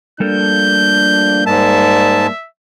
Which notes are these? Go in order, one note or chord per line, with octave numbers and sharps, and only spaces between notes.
F3 G3 A3 A#3 D4 A4 G6
G#2 A#4 D5 E5 A5